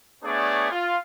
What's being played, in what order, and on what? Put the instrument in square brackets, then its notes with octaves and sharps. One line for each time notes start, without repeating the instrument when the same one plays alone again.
[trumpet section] A3 B3 D4 G#4 C#5 D5
F4